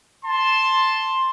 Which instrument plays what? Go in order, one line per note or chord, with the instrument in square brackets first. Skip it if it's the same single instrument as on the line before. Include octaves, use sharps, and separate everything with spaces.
[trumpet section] A5 C6